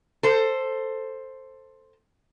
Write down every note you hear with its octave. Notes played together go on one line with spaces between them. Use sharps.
A4 C5